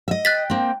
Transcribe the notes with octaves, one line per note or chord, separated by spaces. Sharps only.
D#5 E5
G5 F#6 A6 B6
A#3 C4